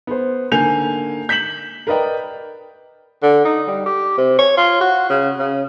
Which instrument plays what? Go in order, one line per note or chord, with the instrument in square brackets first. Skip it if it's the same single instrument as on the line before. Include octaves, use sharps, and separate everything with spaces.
[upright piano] B3 C5
G#2 D3 A#3 G#5 G6 F7
G6 B6 E7 F#7
A#4 B4 D5 D#5 G5
[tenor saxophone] D3
D#4
G3
G4
C3
C#5
F4
F#4
C#3
C#3